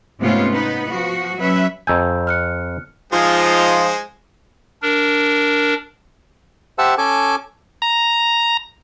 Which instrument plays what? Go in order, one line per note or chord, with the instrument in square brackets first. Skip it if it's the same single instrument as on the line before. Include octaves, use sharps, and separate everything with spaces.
[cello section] G#2 C3 A3 B3 C#4 F4
B3 D#4 B4
F3 F#4
F#3 C#4 B4 E5
[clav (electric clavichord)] F2 G#5 [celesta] A#5 E6 G6
[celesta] F6 F#6 C#7
[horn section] F3 D#4 F4 [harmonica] G#3 C5 G#5
[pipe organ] D4 A#4
[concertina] G4 C5 E5 F#5 A5 E6
C#4 A4 G#5 D6
[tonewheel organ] A#5